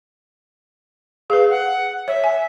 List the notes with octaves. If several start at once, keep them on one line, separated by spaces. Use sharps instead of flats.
G#4 B4 F5
F#5
C#5 E5
G#5